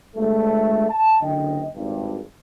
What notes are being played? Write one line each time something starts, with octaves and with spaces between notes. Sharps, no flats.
G1 G#3 A3
A5
F#1 D3 D#5 G5
G#1 G2